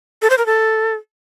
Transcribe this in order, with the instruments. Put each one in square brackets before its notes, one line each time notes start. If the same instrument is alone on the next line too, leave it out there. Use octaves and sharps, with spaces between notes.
[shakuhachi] A4
C5
A#4
A4